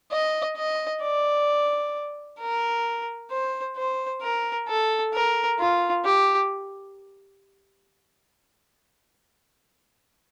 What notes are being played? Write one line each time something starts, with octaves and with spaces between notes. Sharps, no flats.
D#5
D#5
D5
A#4
C5
C5
A#4
A4
A#4
F4
G4